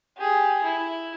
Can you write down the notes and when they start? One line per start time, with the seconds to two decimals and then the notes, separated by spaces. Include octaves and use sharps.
0.17 G4 G#4
0.64 E4